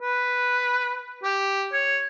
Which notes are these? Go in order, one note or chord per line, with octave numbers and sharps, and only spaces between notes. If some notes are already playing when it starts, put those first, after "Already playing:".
B4
G4
C#5